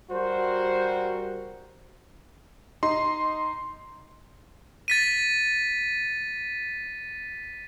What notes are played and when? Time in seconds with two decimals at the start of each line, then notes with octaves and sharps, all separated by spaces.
0.10 G3 F#4 A#4 C5
2.83 D#4 C6
4.88 A6 B6 D#7